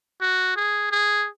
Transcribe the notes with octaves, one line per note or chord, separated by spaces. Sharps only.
F#4
G#4
G#4